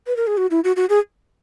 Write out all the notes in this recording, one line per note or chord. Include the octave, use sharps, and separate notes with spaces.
B4
A#4
G#4
F#4
E4
F#4
F#4
G#4